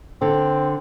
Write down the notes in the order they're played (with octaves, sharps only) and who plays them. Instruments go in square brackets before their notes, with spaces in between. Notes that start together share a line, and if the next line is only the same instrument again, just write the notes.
[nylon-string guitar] D3 [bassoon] C4